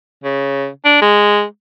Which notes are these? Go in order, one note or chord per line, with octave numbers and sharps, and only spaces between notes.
C#3
D4
G#3